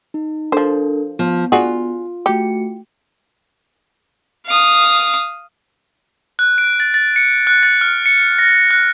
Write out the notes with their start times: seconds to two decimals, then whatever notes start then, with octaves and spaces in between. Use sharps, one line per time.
0.14 D#4
0.52 F3 D4 A4 A#4 C5
1.19 F3 B3
1.52 D4 F4 F#4 G#4
2.26 A3 F#4 G4 C#7
4.46 F5 D#6
6.39 F#6
6.58 D7
6.80 A6
6.94 A6
7.16 C#7
7.47 F#6
7.63 A6
7.81 F6
8.06 C#7
8.39 A#6
8.71 F#6